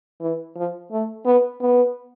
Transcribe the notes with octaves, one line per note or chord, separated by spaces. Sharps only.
E3
F3
A3
B3
B3